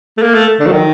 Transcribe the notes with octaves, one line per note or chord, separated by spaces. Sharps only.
A3
A#3
A3
D3
F#3
D#3